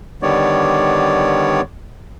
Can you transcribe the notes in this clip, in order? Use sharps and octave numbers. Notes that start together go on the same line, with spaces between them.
D3 D#3 G3 B3 C#5 D5